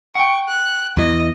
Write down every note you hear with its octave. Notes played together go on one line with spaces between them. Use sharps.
F#5 G5 C#6
F#6
E2 E3 D#5